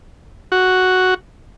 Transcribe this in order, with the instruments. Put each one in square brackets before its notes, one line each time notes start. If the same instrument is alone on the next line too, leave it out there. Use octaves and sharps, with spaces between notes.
[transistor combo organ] F#4